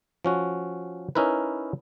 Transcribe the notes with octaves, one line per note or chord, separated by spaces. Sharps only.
F3 C#4 F#4
C#4 D#4 E4 A#4 B4